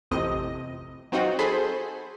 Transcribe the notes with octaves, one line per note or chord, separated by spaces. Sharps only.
A1 F2 A2 C3 D#5
F#3 C4 D#4 F4 F#4
G#4 A4 C5 B5